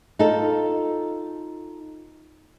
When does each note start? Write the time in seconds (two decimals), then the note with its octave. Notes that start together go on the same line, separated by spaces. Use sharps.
0.19 D#4 F4 A4